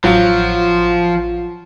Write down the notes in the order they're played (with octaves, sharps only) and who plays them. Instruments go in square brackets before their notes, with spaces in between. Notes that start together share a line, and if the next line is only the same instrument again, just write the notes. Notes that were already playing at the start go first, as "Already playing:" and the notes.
[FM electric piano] A1 F4 F5 [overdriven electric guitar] F3 [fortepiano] F#3